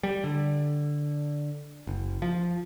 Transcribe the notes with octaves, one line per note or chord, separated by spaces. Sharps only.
G3
D3
F#1
F3